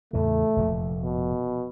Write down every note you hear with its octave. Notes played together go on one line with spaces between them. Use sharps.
E2 A2 C#3 A3
F1 A#2 F3
B2